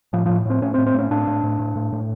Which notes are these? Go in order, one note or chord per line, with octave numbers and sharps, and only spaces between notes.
A2 F3
A2 F3
A2 C4
A2 C#4
C4
A2
C4
A2 C#4
A2 D4
A2
A2
A2
A2
A2